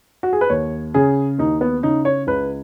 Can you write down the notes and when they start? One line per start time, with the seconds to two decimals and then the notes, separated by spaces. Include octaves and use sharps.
0.23 F#4
0.33 G#4
0.41 B4
0.50 D#2 C#5
0.94 C#3 G#4
1.38 D#2 D#4
1.61 B3
1.83 C#3 D#4
2.05 C#5
2.27 C#2 B4